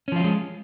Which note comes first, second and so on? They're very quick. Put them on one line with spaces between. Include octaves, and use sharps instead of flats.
C#4 F3 F4 F#3 G#3